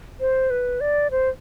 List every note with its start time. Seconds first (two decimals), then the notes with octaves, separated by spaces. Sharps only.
0.20 C5
0.50 B4
0.81 D5
1.11 C5